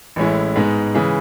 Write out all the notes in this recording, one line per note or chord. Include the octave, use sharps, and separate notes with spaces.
A1 A2 G#3 C#4 E4
G#2 G#3 B3
C#3 E3 G#3